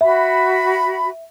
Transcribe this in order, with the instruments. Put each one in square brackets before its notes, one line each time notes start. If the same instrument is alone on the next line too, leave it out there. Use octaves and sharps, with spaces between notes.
[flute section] F#4 B5 [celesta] E5